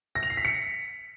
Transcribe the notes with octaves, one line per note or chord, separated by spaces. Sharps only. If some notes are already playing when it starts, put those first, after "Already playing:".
A#6
F7
C7
B6
C#7